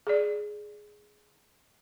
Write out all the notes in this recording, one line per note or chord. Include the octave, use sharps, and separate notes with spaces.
G#4 D5